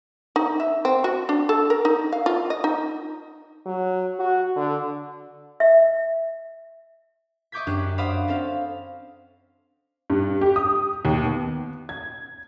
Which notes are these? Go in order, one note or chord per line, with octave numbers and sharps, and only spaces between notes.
D#4
E5
C4
F#4
D4
A4
A#4
D#4
F5
F4
D#5
D#4
F#3
F#4
D3
E5
D#5 C#6 D6 G6 G#6 B6
F#2 C#4 D4 G4 F#6
C5 D5 F5 F#5 B5 D#6
C4 C#4 A4 C5 F5
G2
G4
D#6
D#2
B3
G#6